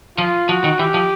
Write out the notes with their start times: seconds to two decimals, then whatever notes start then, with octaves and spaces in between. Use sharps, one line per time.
0.18 F3 F4
0.49 F3 F#4
0.64 D#3
0.79 E3 G4
0.94 F3